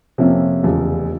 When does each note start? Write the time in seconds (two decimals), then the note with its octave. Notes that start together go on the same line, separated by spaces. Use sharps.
0.18 F2 C3 F3 A#3 C#4
0.63 F1 E2 C#3 F3